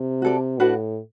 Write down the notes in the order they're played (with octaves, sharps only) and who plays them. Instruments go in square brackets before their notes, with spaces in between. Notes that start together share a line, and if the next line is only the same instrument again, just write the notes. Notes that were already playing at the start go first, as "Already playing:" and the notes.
Already playing: [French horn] C3
[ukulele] F#4 A4 D5
[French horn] A2 [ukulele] D4 F#4 B4 F#5